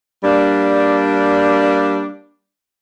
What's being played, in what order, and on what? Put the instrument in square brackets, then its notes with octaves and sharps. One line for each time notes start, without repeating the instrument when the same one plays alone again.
[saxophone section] G3 A#3 D4